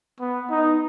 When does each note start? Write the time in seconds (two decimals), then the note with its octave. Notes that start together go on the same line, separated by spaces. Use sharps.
0.20 B3
0.50 D#4